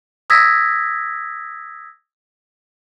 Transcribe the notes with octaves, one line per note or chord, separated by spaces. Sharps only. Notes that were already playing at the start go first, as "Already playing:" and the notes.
D#6 E6 G#6 A#6 B6